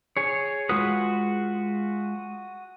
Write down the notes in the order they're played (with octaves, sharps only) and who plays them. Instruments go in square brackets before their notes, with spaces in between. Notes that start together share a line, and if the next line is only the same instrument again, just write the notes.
[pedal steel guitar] G#4 C#5
[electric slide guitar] G#3 F4 B4 [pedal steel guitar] F#4 D#6